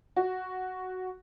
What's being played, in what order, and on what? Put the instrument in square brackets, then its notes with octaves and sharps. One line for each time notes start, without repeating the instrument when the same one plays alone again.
[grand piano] F#4